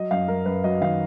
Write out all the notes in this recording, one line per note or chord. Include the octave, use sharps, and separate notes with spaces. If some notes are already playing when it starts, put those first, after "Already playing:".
Already playing: F#3 D#5
F#2 F5
F#2 A#4
F#2 B4
F#3 D#5
D#3 F5